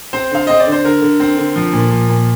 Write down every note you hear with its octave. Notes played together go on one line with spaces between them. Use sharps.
C4 C5
D3 F5
C4 D#5
D5
D3
C5
D3 A#4
D3
C4
D3
F3
A#2
F3
A#2